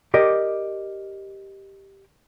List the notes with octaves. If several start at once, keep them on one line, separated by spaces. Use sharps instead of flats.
G4 A#4 D5 D#5